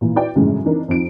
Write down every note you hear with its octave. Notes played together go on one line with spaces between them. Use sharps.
A#2 E3
E4 F#4 B4 D5 G5
G1 F#2 A2 C#3 E3 G#3
E3 C4 D4 D#4 A#4
F2 F3 D#4 D7